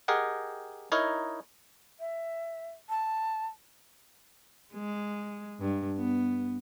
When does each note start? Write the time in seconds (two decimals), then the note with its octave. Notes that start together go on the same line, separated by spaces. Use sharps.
0.08 G4 G#4 A#4 D#5 F#5 G5
0.92 D#4 E4 A#4 C#5 D#5
2.00 E5
2.89 A5
4.73 G#3
5.60 G2
5.97 B3